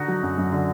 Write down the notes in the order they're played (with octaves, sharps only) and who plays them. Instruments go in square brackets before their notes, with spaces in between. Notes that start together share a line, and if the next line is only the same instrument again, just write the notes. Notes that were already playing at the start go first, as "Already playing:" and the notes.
Already playing: [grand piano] D3 [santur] D#4 F#4
[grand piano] F#3
F#2
F#2
D3